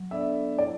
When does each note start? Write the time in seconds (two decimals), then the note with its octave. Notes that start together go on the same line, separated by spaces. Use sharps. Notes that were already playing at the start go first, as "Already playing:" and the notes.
Already playing: F#3
0.11 B3 D4 A4 D5 E5
0.58 E4 D5